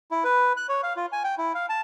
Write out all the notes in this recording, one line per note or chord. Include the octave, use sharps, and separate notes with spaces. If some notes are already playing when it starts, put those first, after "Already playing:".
E4
B4
F#6
C#5
F5
F4
G#5
G5
E4
F5
A5